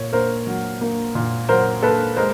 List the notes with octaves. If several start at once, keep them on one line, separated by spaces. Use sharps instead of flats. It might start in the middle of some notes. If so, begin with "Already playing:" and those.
Already playing: A#2 A#3 C#5
A#3 A#4 C5
F#3
A#3
A#2
F#3 A#4 C5
A#3 A4 B4
G#3 A#4 C5